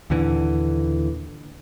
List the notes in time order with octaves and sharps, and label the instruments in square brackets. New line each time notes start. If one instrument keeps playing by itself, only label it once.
[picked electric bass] D#2 A#2 D3 E3